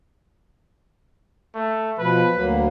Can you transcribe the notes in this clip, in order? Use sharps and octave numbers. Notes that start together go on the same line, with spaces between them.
A3
B2 F3 B4
D2 F#3 A#3